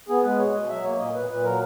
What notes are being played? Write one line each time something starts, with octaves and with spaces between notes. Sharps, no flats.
B3 G#4
G#3 B4
B2 C#5
B2 D#5
F#3 E5
A#3 C#5
A#2 D#5
A#2 B4
A#2 B4
F#3 A#4